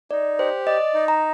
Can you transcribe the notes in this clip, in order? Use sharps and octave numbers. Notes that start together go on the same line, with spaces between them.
D#4 D5
G4 C5
D5 D#5
D#4
A#5